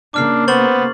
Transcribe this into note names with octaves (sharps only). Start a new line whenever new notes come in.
C#3 A#3 D4 D6 F6 C7
B3 C5 C#6 A6 F#7